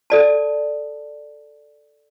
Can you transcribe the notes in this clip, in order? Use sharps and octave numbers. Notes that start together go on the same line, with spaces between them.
A4 D5 A5